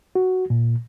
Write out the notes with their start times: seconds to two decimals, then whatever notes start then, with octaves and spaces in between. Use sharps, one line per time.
0.15 F#4
0.50 A#2